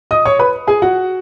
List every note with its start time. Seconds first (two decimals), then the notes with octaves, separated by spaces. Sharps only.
0.11 D#5 D#6
0.25 C#5 C#6
0.39 B4 B5
0.67 G#4 G#5
0.82 F#4 F#5